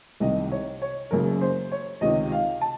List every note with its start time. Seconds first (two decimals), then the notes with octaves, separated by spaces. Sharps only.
0.20 C2 C3 D#3 D#5
0.52 C#5
0.82 C#5
1.11 F#1 F#2 C#3 A#4
1.41 C5
1.72 C#5
2.01 C#2 C3 D#3 D#5
2.32 F5
2.61 A5